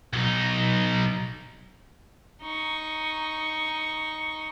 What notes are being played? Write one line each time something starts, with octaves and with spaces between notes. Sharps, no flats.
B1 D#4
D#4 C#6